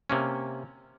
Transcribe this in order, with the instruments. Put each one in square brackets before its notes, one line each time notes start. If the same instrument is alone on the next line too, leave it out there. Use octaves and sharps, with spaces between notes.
[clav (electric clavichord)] C3 A#3 C#4